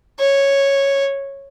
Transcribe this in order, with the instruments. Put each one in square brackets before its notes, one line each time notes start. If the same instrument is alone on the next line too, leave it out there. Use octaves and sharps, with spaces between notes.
[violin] C#5